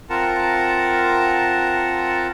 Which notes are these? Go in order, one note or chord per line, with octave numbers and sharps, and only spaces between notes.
C4 F4 A#4 F#5 A5 A#5